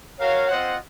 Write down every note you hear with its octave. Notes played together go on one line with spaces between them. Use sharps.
F#4 A#4 C#5 F5
C4 F4 C5 D#5 F#5